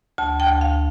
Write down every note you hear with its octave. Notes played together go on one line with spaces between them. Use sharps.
D2 A5
G5
D2
F5